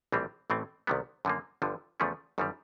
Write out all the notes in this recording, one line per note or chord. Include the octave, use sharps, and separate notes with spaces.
A#1 A2 E3 G3 C4
A1 A2 E3 A3 C4
C2 C3 D#3 G3 B3
F#2 D3 F3 A#3
G1 G2 D3 F3
E2 C#3 F3 A3 C#4
G1 F#2 D#3 G3